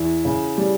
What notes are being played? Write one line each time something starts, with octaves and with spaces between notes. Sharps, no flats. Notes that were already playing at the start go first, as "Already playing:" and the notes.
Already playing: E2 E4
C#3
G3